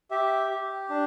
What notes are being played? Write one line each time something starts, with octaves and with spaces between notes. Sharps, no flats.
G4 E5
G4
D4